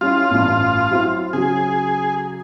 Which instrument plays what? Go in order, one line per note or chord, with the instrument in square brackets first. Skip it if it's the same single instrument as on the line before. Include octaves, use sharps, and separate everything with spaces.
[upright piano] G3 C#4 E4 [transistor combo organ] F4
[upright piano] A1 G2
F#3 C4 E4
[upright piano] C#3 F#3 [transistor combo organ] G#4